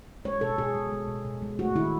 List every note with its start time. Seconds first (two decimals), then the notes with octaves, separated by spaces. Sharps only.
0.25 G#3 C#5
0.41 B2 A4
0.58 B2 G#4
0.75 G#3
0.92 G#3
1.08 B2
1.25 B2
1.42 G#3
1.59 A3 F#4
1.76 D#3 E4